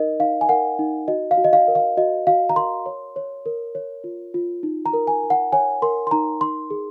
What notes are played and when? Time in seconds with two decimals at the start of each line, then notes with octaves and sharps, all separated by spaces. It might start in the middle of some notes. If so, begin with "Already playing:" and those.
Already playing: D#4 A#4 D#5
0.20 D#4 F5
0.41 G#5
0.49 A#4 F#5
0.79 D#4
1.08 F#4 D#5
1.31 F5
1.38 F#4
1.44 D#5
1.53 F5
1.68 A#4
1.75 F5
1.97 F#4 D#5
2.27 F#4 F5
2.49 A#5
2.56 A#4 C6
2.86 C#5
3.16 C#5
3.46 A#4
3.75 C#5
4.04 F4
4.34 F4
4.63 D#4
4.86 A#5
4.93 A#4
5.07 G#5
5.23 A#4
5.30 F#5
5.52 C#5 G#5
5.82 A#4 C6
6.07 C6
6.11 D#4 A#5
6.41 D#4 C6
6.71 G#4